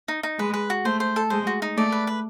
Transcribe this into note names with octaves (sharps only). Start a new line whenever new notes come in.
D#4
D#4
G#3 B4
B4
F#4
A3 C5
C5
A4
G#3 C5
F#4
D#4
A3 D5
B4
B4